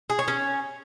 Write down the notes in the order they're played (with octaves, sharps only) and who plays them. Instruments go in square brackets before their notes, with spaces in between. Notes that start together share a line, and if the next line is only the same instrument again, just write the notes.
[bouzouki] G#4
C#5
C#4